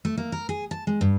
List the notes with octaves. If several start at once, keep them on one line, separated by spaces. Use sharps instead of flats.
A3
A#3
A#4
G#4
A5
G#3
G2